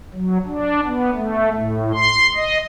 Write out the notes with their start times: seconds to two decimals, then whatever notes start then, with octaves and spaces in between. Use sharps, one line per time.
0.13 F#3
0.46 D4
0.85 B3
1.14 A3
1.54 A2
1.93 C6
2.35 D#5